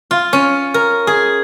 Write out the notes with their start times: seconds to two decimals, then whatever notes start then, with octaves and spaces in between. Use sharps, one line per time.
0.11 F4
0.33 C#4
0.74 A#4
1.07 G#4